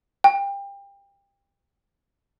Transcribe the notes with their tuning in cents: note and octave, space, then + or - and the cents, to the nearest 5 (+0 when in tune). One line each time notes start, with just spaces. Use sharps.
G5 +25